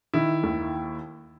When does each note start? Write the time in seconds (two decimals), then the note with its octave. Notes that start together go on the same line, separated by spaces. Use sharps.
0.14 D#3 E4
0.43 D#2